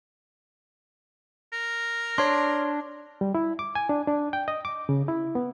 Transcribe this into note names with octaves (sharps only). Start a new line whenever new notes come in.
A#4
D4 C#5 C6
G3
E4
D6
G#5
D4
D4
G5
D#5
D6
C#3
E4
B3